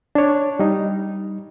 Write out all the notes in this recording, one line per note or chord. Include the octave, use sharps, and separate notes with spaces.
D4 C#5
G3 D#4